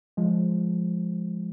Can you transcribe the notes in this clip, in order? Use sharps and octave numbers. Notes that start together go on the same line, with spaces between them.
F3 G#3